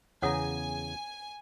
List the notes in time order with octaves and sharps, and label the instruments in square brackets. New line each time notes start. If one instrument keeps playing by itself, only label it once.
[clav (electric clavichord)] E2 C#3 A#5 [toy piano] C#5 F#5 D#6 [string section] G#5